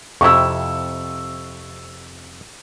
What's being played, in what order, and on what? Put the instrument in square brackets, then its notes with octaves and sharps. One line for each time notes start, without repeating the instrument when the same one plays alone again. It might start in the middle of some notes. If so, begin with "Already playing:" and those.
[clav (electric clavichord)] F2 C3 E4 [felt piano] C#6 E6